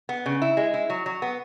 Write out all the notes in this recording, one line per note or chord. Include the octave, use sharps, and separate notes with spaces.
B3
C#3
E4
G#3
E4
F#3
F#3
B3